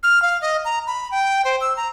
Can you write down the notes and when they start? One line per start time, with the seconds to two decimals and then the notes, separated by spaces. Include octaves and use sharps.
0.03 F6
0.22 F5
0.42 D#5
0.65 A#5
0.87 B5
1.11 G5
1.45 C5
1.61 E6
1.77 A#5